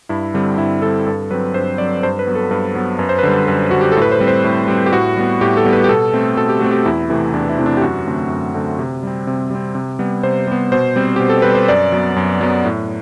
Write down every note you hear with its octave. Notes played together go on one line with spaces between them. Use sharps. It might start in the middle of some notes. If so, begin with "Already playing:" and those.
G2 E4
D3 G3 C4
G2 E4
D3 G3 C4 A4
G2 A4
F#3 C4 B4
G2 C5
F#3 C4 D5
G2 C5
B4
F#3 B3
A4
G2 B4
F#3 B3
F#2 B4
C5
B4
D3 G3
F#2 B4
D3 G3 F#4
G4
A2 A4
B4
C5
G3 C4
C5
A2
G3 C4
G4
A2 F#4
G3 B3
A2 G4
A4
G3 B3
B4
G4
B2 A4
A3 C4
B2 A4
G4
A3 C4 F#4
G4
E2 E4
C3 E3 A3 C4
E2 D4
E4
C3 E3 A3 C4
D4
G4
F#2 F#4
D3 A3 C4
F#2
D3 A3 C4
C3
G3 C4
C3
G3 C4
C3
G3 B3
C3 C5
G3 B3
B2 C5
G3 C4
B2 G4
A4
G3 C4 B4
C5
F#2 D5
F#3 B3
F#2
F#3 B3
A2